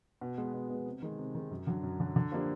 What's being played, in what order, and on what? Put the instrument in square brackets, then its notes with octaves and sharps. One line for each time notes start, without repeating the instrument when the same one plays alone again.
[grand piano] B2
G#3 B3
B2
G#3 B3
C3
D#3 G#3
C3
D#3 G#3
F#2
D3 F#3
F#2
D3 F#3
D3
F3 A#3 D4 G4